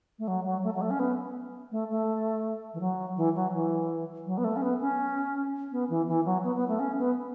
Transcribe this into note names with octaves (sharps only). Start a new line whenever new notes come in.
A3
F#3
F#3
A3
F#3
A3
C#4
B3
A3
A3
E3
F#3
E3
F#3
E3
F#3
B3
A3
C#4
B3
C#4
B3
E3
E3
F#3
B3
B3
A3
C#4
B3